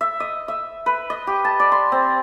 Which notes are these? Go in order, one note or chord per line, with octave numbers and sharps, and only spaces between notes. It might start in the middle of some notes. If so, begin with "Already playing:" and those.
E5
D#5
E5
B4
D#5
G4
A5
D5
C6
C4